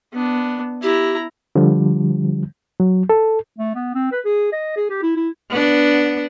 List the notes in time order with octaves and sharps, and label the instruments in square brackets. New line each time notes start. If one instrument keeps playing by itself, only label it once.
[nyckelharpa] B3 D4
[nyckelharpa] E4 A#5 [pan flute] G4
[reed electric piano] D3 F3 G3
F#3
A4
[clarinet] A3
B3
C4
B4
G#4
D#5
G#4
G4
E4
E4
[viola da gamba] B3 D4